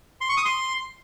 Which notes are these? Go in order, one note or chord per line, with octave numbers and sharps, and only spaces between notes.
C6
C#6
D#6
C6